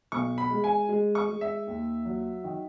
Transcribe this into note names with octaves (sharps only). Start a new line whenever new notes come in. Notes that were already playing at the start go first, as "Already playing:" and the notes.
B1 C#6
B5
G#3
G#5
G#3
C#6
G#3
E5
D#2
F#3
D#3